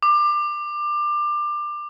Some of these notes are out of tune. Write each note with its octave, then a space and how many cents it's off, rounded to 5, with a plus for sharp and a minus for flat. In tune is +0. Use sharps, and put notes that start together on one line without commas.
D6 +25